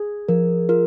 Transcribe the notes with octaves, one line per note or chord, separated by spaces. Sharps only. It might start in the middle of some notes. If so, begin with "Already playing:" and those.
Already playing: G#4
F3 A#4
F4 A#4